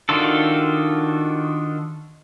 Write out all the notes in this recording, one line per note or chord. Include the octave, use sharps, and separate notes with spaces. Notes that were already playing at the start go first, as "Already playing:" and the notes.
D#3 D4 F4 F#4 A4